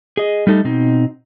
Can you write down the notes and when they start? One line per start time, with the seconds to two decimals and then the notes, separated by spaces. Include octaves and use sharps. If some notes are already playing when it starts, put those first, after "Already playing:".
0.17 G#4 D#5
0.47 G3 A3 D#4 A4
0.64 B2 C4 D#4